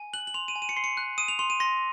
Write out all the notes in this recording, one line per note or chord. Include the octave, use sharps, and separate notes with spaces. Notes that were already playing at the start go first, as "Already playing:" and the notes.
Already playing: G#5
F#6 F#7
F#7
C6 F7
D#7
G#5
D#7
C#7
C6 C7
C#7
F#6
D#6 D#7
F7
C6 F7
D#7
C6 A#6